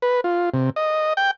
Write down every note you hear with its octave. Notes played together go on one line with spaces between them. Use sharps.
B4
F4
C3
D#5
G5